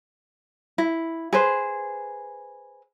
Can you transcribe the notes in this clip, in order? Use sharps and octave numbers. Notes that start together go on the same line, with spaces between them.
E4
G#4 B4 C5